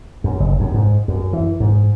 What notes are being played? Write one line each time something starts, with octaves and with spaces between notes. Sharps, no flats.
F#2
F#1
F#2
G#2
F#2
E3
G#2